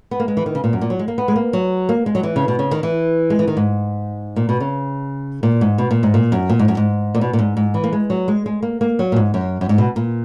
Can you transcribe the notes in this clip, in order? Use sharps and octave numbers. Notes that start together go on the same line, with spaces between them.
B3
A#3
G#3
E3
D#3
C#3
A#2
F#2
A#2
F#3
G#3
A#3
B3
G#3
A#3
F#3
A#3
G#3
F#3
E3
C#3
B2
C#3
D#3
E3
G#3
E3
D#3
G#2
A#2
B2
C#3
A#2
G#2
B2
A#2
G#2
A#2
F#2
A#2
G#2
F#2
G#2
A#2
B2
A#2
G#2
G#2
E3
A#3
G#3
F#3
G#3
G#3
A#3
A#3
F#3
A#2
G#2
F#2
F#2
G#2
B2
A#2